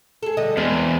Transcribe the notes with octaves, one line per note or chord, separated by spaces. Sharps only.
G#4 A4
D3 G3 D#5
E2 G#3 C4